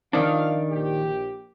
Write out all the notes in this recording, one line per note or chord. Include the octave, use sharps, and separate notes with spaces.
D#3 F3 D4 F5
A#1 G4